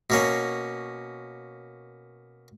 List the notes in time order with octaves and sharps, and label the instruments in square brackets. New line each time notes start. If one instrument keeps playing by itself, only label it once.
[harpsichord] B2 A#3 C#4